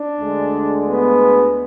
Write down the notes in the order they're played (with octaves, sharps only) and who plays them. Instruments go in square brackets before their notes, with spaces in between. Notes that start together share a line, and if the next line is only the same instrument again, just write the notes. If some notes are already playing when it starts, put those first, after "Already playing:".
Already playing: [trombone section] D4
D2 D3 G#3
B3